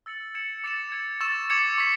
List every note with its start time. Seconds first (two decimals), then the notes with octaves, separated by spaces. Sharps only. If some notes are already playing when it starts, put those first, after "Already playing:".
0.06 E6 A6 C#7 F#7
0.35 G#6 C#7 E7
0.64 D6 A6 C#7 E7
0.92 G#6 C#7 E7
1.20 C#6 E6 A6 E7
1.50 D6 G#6 C#7 F#7
1.78 C#6 G#6 B6